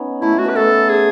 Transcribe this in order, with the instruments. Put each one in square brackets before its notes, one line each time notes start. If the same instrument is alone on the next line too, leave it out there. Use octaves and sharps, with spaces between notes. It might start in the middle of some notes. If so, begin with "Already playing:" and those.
Already playing: [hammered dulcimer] B3 C#4 D#4
[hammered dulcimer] A3 [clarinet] E4
[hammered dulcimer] A3
[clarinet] F#4
[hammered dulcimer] B3 [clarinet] B4
[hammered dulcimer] A3 [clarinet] A4
[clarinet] G#4